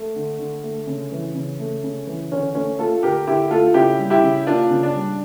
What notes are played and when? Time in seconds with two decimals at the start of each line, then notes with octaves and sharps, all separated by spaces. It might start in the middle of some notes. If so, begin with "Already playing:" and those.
Already playing: A3
0.16 D3
0.39 D3
0.63 A3
0.87 C#3
1.12 E3
1.35 C#3
1.59 A3
1.84 C#3
2.07 E3
2.31 D3 C#4
2.55 A3 C#4
2.79 A3 F4 A4
3.03 D3 G4 A#4
3.27 D3 E4 G4
3.50 A3 F4 A4
3.74 C#3 E4 G4
3.99 G3
4.10 E4 G4
4.23 C#3
4.47 A#3 D4 F4
4.71 C#3
4.83 D4
4.95 G3